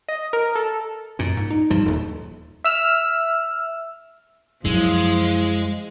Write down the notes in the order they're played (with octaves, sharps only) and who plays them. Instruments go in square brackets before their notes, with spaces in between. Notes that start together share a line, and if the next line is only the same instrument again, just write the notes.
[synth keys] D#5
A#4
A4
[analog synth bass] F#2 [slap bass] A#2
[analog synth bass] G#2
D#4
[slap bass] G2 F3
D#1 D#2
[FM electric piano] E5 E6 F6
[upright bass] F#2 [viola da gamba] F3 [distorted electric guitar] G#3 [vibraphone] E4